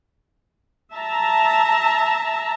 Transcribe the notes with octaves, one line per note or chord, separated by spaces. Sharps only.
E5 A5 A#5